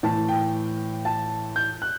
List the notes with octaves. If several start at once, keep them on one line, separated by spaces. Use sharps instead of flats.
A2 E3 A5
G5
A5
G6
F#6